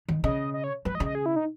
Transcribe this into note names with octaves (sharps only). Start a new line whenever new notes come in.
D#3
C#3 D#5
D#5
C#5
F#3 B4
D#5
C#3
D#5
G#4
E4
D#4